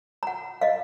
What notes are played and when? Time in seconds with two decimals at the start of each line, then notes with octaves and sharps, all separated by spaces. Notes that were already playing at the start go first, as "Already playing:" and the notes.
0.23 F#5 A#5
0.61 D#5 F5